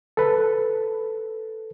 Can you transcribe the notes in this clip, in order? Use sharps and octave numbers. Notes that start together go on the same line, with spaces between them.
A4 B4